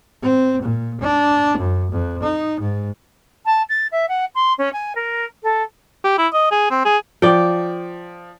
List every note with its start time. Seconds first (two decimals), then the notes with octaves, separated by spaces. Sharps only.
0.22 C4
0.63 A#2
1.01 D4
1.58 F#2
1.91 F2
2.22 D#4
2.60 G#2
3.45 A5
3.69 A6
3.91 E5
4.08 F#5
4.34 C6
4.58 C#4
4.73 G#5
4.95 A#4
5.43 A4
6.04 G4
6.18 E4
6.33 D#5
6.51 G#4
6.70 C4
6.85 G#4
7.22 F3 D5 G5